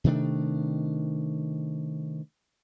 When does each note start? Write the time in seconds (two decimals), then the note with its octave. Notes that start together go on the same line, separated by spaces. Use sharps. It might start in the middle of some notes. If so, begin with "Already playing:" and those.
0.04 C3 D#3 A3 D4